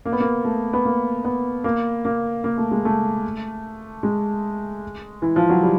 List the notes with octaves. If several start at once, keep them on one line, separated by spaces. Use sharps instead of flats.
A#3
B3
A#3
A3
B3
A#3
B3
A#3
A#3
A#3
A3
G#3
A3
G#3
E3
F3
F#3
G3